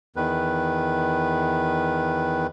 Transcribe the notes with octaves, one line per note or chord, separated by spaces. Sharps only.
E2 D#3 B4